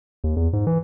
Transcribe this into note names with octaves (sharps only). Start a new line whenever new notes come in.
D#2
E2
G#2
E3